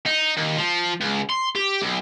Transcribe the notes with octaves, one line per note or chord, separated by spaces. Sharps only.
D#4
D#2
F3
C#2
C6
G4
B1